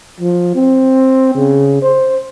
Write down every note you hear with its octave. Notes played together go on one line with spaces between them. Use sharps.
F3
C4
C#3
C5